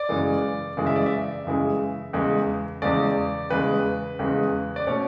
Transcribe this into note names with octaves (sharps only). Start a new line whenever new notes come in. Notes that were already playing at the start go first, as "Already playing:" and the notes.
Already playing: D5
F#2 C#3 E3 G#3
F#2 C#3 E3 G#3
E5
D5
E5
F#2 C#3 E3 G#3
E2 C#3 G#3
E2 C#3 G#3 D5
E2 C#3 G#3 B4
E2 C#3 G#3
D5
B2 A3 C#4 C#5